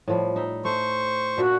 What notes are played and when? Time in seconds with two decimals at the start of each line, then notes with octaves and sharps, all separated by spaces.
0.08 A2 F3 G3
0.36 D#4 E5
0.65 A3 C5 C#6
1.38 A#2 D4 F#4 E5